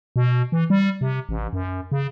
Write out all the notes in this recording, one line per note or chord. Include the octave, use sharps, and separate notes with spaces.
B2
E3
G3
C3
A1
F#2
C#3